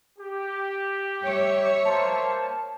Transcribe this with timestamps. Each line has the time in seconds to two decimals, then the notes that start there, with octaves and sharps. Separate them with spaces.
0.19 G4
1.22 G3 C#5 E5
1.85 A#3 C5 A5